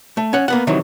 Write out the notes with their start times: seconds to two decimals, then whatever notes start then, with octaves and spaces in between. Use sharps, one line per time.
0.17 A3
0.33 C#4 F#5
0.48 A#3 B3 F#5
0.67 C3 D#3 E3 F#3